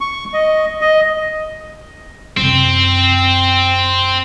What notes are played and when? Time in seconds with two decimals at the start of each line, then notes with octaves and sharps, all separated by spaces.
0.01 C#6
0.34 D#5
0.81 D#5
2.37 F#2 C3 C4